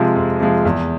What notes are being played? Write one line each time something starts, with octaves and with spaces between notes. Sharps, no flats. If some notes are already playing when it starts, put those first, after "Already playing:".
Already playing: C3 F3 G#3
F2
C3 F3 G#3
E2